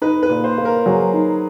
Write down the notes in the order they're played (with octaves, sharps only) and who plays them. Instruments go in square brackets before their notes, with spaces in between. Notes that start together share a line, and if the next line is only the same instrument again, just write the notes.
[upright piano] D#4 [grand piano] B4
[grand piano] B4
[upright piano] A#2
[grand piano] C5
[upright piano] A#3
[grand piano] A#4
[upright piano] F#3 [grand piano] G#4
[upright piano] D#4